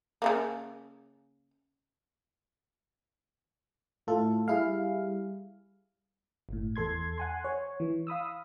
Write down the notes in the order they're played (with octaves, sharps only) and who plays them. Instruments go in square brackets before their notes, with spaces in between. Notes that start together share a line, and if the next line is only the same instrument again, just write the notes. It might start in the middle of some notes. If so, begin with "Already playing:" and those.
[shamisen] C#3 E3 A#3
[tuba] A2 [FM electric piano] A3 F4 A4
[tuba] G3 [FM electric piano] E4 G#4 F5
[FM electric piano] G1 A2
E2 A4 C6 G#6
F#5 G#5 C6
C#5
E3
F5 B5 D#6 E6